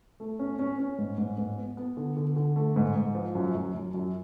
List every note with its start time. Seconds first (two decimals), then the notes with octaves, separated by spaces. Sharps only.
0.20 A3
0.39 C#4
0.59 C#4
0.79 C#4
0.98 G#2
1.18 G#2
1.38 G#2
1.57 B3
1.77 B3
1.97 D3
2.17 D3
2.36 D3
2.56 A3
2.76 G#2
2.96 G#2
3.15 F3
3.35 F#2
3.55 F#2
3.74 F#2
3.94 F#2